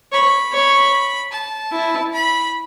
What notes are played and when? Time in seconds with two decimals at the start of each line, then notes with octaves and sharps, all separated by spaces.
0.12 C#5 B5
0.53 C#5
1.32 A5
1.72 E4
2.12 B5